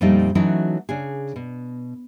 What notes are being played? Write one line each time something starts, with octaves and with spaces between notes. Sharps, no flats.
F2 A#2 G3 A3 D#4
E3 F#3 A3 C#4 D#4 F#4
C#3 D4 G#4
B2